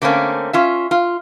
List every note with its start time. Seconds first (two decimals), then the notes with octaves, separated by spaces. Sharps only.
0.02 D3 A3 A#3 C4 C#4
0.53 C#4 F4 E5
0.91 F4